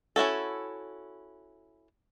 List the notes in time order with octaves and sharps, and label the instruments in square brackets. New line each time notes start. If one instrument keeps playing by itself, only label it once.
[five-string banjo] C#4 E4 F#4 A4